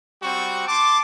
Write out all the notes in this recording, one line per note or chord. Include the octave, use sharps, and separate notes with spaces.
G3 C4 F#4 C#6
A5 C6 D6